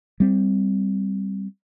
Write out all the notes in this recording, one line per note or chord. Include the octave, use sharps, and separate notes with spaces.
G3 C4